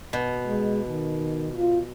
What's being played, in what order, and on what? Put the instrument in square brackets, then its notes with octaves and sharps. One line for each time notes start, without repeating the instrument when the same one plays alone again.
[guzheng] B2
[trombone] G#3
D#3
F4